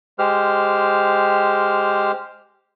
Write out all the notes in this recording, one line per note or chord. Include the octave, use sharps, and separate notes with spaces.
G#3 G4 C5 F6